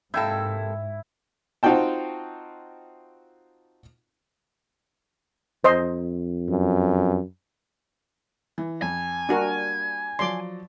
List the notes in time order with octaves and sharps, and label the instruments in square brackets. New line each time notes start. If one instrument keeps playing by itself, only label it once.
[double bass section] G#2 [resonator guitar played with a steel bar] C3 A#3 A4 [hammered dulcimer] E4 [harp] G5 E6 G6
[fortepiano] C4 D#4 F4 F#4 G5 A5
[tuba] F2 [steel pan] C5 D#5 C6
[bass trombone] F#2
[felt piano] E3
[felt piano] F2 [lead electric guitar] G#5
[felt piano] G3 A#3 [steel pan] D4 F#4 A#4
[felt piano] F3 F#3 D5 [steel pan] C6 D6